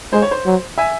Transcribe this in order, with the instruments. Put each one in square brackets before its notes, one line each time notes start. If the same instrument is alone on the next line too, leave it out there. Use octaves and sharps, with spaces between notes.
[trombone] G#3 [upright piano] C5
[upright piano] C#5
C5
[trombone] F#3
[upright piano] E5 G#5